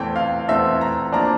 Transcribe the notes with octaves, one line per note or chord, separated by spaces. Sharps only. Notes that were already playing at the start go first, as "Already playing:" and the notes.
Already playing: E2 E3 A3 C4 G5
F5
E2 E3 A3 C4 E5
A#5
F3 A#3 D4 A#5